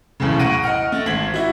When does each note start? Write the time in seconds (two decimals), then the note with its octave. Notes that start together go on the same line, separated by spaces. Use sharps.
0.20 B1 E2 A2 C#3
0.39 F#5 C#6 F#6 A#6 D7 D#7
0.62 D#5 F#5 F6 D7
0.92 A3 A6
1.06 G#1 G#6 B6 F#7
1.34 E4 F#4